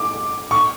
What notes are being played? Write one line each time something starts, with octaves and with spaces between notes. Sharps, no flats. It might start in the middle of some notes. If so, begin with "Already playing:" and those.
Already playing: D6
C#6